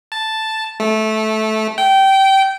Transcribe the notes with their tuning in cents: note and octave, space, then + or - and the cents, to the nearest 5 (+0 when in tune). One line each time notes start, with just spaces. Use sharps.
A5 +0
A3 -15
G5 -20